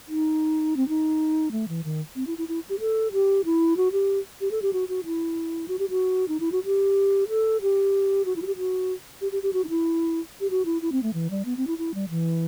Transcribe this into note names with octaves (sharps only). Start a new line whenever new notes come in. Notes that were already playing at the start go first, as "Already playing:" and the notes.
D#4
C4
D#4
A3
E3
D#3
C4
E4
E4
E4
G4
A4
G4
E4
F#4
G4
G4
A4
G4
F#4
F#4
E4
F#4
G4
F#4
D#4
E4
F#4
G4
A4
G4
F#4
E4
F#4
G4
F#4
G4
G4
G4
F#4
D#4
E4
G4
F#4
E4
E4
C4
A3
E3
G3
B3
C4
E4
E4
G3
E3